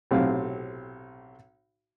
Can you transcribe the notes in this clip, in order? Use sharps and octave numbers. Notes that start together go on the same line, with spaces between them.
B1 A2 C3 C4 F5